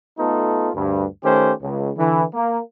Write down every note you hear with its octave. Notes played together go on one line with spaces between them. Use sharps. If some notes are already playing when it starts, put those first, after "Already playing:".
A3 B3 D#4 F4 A4
D2 G2
D#3 A3 C#4 G4 C5
C#2
D3 E3
A#3